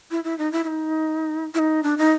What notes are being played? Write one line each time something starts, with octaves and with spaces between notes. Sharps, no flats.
E4
E4
D#4
E4
E4
D#4
E4
D#4
D4
D#4